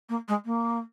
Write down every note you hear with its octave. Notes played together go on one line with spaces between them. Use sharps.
A#3
G#3
A#3